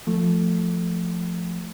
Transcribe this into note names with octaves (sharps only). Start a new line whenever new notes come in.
F3 A3